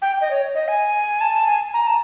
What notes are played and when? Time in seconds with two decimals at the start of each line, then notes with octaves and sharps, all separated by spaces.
0.02 G5
0.21 D#5
0.31 C#5
0.55 D#5
0.68 G#5
1.21 A5
1.34 A5
1.47 G#5
1.74 A#5
1.87 A5